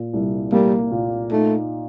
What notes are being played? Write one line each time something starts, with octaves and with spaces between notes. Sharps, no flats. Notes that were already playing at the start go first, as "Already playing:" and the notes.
Already playing: A#2
C2
G3 A#3
A#2
A3 D#4